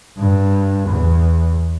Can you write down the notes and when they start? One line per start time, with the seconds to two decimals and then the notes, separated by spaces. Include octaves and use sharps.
0.18 G2
0.89 E2